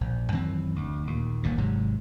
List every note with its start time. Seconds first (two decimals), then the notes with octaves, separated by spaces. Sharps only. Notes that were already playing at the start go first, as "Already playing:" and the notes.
0.01 A#1
0.32 F#2 D#3 E3 C4
0.76 D2
1.07 D#2 A#2
1.43 G1 D#2 A#2
1.58 G#1 G#2 C3 F#3